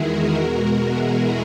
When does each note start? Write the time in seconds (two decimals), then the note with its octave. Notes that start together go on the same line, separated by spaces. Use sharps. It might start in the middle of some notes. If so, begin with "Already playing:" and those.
Already playing: E2 D#3 G#3 E4 F#4 G#4 A#4
0.35 E2 B2 G#3
0.84 E4 G#4